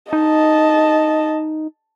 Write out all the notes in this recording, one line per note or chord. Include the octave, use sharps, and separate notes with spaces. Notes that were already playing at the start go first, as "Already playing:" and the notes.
D#4 D#5 A5